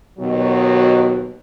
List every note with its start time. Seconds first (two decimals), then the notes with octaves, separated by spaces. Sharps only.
0.19 D#2 B2 F#3 F#4